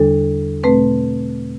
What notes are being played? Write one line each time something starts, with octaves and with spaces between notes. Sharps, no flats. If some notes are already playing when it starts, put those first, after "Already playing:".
Already playing: E2 D3 G3 D4 A4
B2 A3 C4 B4